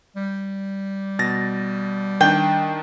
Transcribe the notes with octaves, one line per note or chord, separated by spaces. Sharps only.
G3
B2 A6 A#6
D#3 D4 G5